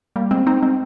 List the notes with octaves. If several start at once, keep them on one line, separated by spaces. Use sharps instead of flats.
G3 A#3
G#3 C4
C4 D#4
G#3 C4